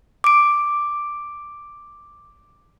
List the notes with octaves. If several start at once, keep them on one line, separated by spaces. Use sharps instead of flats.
D6 D7